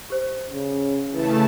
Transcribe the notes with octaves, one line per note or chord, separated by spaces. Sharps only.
G4 C5
C#3
C#3 E3 A3 A5